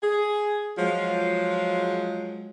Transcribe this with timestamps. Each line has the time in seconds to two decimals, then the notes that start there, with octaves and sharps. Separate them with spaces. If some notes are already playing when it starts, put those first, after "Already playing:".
0.03 G#4
0.78 F3 F#3 G#3